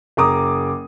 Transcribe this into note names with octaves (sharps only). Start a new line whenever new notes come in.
F#1 A#5 D6 D#6